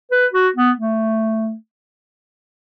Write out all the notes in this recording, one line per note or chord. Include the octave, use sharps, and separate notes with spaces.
B4
F#4
B3
A3